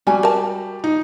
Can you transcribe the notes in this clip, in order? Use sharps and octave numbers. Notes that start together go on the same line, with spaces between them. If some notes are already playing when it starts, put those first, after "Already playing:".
G3 F#4 G#5
A#4 A5
D#4